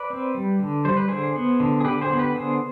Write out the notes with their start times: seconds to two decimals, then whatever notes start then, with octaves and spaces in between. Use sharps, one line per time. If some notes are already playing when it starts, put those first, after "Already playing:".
Already playing: B4 D5
0.10 C4
0.35 G3
0.59 D3
0.85 G3 C5
0.97 B4
1.08 D3 G#4 C5
1.35 B3
1.60 D3
1.80 G#4
1.85 D3 G4 B4
2.02 G#4 C5
2.10 B3
2.18 G4 B4
2.35 D3 G#4 C5